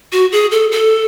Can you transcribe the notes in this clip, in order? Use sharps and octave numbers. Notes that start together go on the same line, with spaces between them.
F#4
G#4
A4
A4